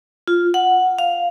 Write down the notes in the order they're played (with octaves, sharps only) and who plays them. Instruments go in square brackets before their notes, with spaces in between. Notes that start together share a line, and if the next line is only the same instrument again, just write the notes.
[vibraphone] F4
F#5
F5